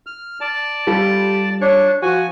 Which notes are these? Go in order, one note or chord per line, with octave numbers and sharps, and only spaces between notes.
F6
D5 A5
G3 F4 G4 A4
D4 C#5
F3 F#4 G#5